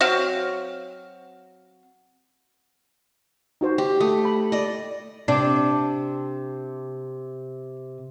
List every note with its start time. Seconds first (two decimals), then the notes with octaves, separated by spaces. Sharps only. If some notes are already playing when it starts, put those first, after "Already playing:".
0.01 F#3 C4 F#4 F5
3.61 D#4 F#4 C5
3.78 G4 C6
4.00 A3 D#6
4.25 B5
4.52 D5 D#5
5.28 C3 D4